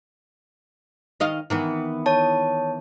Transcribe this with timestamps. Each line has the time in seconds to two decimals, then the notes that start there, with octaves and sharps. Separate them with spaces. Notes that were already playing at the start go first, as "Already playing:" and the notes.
1.20 D#3 D#5 F5
1.50 D#3 E3 B3
2.06 C#5 A5